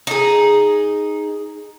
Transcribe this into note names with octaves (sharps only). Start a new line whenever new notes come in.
D#4 G#4